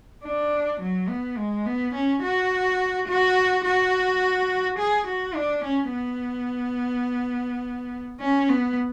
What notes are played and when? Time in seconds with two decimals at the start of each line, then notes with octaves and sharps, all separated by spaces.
0.24 D4
0.81 F#3
1.09 B3
1.37 G#3
1.66 B3
1.94 C#4
2.23 F#4
3.08 F#4
3.65 F#4
4.79 G#4
5.07 F#4
5.35 D4
5.65 C#4
5.93 B3
8.20 C#4
8.49 B3